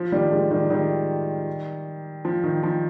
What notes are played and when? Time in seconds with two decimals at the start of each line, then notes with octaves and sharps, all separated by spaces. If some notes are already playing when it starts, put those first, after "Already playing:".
Already playing: F3
0.12 D#3 G3
0.31 F3 G#3
0.51 D#3 G3
0.70 D#3 G3
2.25 F3
2.44 D#3
2.63 F3